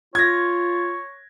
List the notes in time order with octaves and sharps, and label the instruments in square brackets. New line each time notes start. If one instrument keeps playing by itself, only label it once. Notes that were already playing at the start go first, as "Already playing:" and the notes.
[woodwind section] F4 [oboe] C#5 [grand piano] G#6 A#6